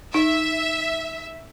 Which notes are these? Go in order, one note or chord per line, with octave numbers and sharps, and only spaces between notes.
D#4 E5